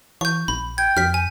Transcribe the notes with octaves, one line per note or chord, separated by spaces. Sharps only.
E3 C#6 G6
A#1 B5
G5 G#6
F2 F6 B6
G#5